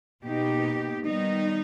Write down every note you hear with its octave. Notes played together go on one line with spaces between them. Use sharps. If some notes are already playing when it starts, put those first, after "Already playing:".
B2 A#3 D#4 G4
D#3 G3 B3 D#4